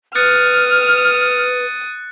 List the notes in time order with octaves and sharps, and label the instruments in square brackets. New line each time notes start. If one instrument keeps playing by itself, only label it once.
[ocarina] B4 [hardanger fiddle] D#6 [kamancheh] F6 [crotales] F#6 A6 C#7